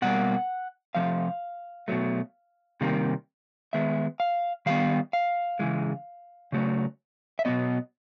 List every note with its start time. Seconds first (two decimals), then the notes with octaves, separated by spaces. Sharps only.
0.02 B2 G3 A#3 F#5
0.95 C3 F3 A3 F5
1.88 B2 F#3 A3
2.81 C3 D#3 G3 A#3
3.73 D#3 G#3 B3 E5
4.20 F5
4.66 D#3 G3 B3 F5
5.13 F5
5.59 C#3 E3 G#3
6.52 C#3 F#3 A3
7.39 E5
7.45 B2 F#3 B3 D#5